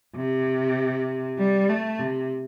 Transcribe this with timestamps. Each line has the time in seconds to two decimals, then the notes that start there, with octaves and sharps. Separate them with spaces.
0.16 C3
1.38 G3
1.69 A3
1.99 C3